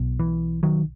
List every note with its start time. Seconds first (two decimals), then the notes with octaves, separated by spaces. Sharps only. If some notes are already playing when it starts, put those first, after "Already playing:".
Already playing: B1 B2
0.20 E3
0.63 D#3 F#3